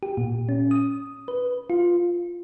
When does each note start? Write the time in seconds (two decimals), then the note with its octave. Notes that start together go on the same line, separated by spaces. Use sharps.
0.03 G4
0.17 A#2
0.49 C#4
0.71 D#6
1.28 B4
1.70 F4